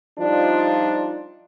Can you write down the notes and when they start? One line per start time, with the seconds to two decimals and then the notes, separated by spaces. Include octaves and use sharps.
0.19 F3 G3 D4 D#4 F4 D5